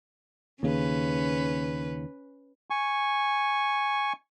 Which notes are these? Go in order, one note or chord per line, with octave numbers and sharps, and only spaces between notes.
D#2 C#3 C#4 B4
G#5 C#6